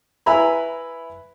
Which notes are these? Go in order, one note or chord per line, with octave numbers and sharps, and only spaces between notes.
E4 B4 E5 G#5 A#5 B5